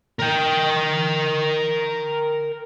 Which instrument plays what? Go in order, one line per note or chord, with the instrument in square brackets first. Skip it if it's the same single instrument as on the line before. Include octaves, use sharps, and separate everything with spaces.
[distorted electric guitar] A#4 G5